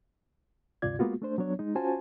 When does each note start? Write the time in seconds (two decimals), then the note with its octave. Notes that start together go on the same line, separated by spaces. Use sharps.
0.82 D2 G2 C3 F4 D5 G#6
0.99 G#3 A#3 B3 F4 F#4
1.22 A3 D4 C5
1.38 F#3 B3 D4 C#5
1.59 G#3 D#4
1.75 C#4 F4 F#4 C5 G#5 A5